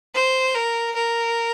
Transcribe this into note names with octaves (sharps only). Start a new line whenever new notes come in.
C5
A#4
A#4